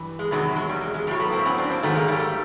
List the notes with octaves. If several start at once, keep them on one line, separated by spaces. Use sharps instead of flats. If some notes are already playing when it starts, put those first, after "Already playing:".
Already playing: G2 E3
G#3
E2 C3 D#3 F#3 G#3
G#3
G3
G#3
G#3
A2 F#3 G3
A3 B3
A#3 C4
B3 C#4
C4 D4
A#3 C4
G#2 D#3 F#3 A3 B3
G#3 A#3
G3 A3